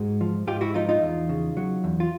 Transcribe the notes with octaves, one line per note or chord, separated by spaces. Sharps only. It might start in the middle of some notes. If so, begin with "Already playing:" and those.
Already playing: G#2 F#4 G#4
F3
G#2 F4 G4
E4 F#4
F3 D#4 F4
D#4 F4
E2
C#3
F#3
E2
F4